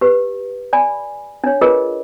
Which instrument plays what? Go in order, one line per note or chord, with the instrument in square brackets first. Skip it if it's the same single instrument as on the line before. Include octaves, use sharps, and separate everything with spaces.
[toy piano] G4 B4
D5 G#5 B5
D4 C#5
F4 G#4 A#4 B4 D#5